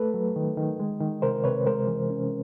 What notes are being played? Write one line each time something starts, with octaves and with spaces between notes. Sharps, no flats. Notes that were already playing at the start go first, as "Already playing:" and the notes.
Already playing: A3 A4 B4
F#3
D#3
D#3
G#3
D#3
C3 A#4 C5
C3 B4 C#5
G#3 A#4 C5
E3
C#4